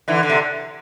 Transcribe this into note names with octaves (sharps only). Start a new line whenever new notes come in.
D3 E3
D3
C3